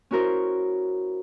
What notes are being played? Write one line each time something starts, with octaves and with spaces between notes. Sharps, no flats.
C#4 E4 F#4 A#4 C5